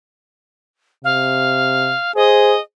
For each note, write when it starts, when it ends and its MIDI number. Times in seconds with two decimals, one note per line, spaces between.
1.04 1.94 48
1.04 2.12 77
2.16 2.59 68
2.16 2.55 72
2.16 2.60 75